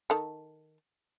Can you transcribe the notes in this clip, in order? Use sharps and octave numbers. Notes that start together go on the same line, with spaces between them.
D#3 A4